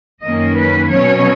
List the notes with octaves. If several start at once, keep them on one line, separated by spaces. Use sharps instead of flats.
F#2 D#3 A#3 C#4 D#5
B4
B2 F#3 C#4 C#5